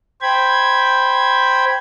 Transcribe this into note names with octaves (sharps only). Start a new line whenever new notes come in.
C5 G5 B5 G#6